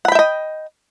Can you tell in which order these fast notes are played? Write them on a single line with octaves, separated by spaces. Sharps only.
F#5 B5 G5 E5 D#5